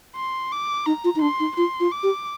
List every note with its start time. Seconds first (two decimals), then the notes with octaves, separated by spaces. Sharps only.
0.16 C6
0.52 D6
0.86 D#4 A#5
1.04 F4
1.16 D#4
1.22 D4 C6
1.40 D#4
1.57 F4 C6
1.80 F4
1.92 D6
2.03 G4